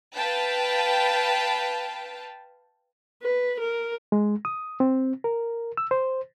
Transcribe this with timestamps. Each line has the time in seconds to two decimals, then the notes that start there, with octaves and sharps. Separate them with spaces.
0.14 B4 F5 G5 A5
3.22 B4
3.60 A#4
4.12 G#3
4.45 D#6
4.80 C4
5.24 A#4
5.77 E6
5.91 C5